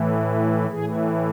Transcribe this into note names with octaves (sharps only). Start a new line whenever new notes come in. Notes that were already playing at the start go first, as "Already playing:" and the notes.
Already playing: A2 E3
A2 E3 G#4